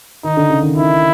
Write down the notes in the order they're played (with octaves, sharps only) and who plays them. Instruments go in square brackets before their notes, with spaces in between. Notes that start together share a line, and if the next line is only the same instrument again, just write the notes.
[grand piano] D#3 [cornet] D#4
[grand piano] D3
C#3
D#3
[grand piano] D#3 [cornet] E4